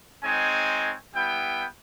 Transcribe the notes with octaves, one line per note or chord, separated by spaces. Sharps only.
G#3 C4 D#4 C#5 G#5
G3 B3 E4 G5